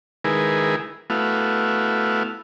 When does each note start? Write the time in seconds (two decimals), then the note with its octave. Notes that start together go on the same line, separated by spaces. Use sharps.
0.24 D#3 G#3 E4 G#4 A#4 B4
1.10 A3 B3 E4 F#4 F5